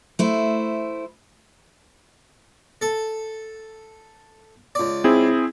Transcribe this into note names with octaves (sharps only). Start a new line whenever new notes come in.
A3 E4 C5
A4
C#2 D5
C4 E4 G#4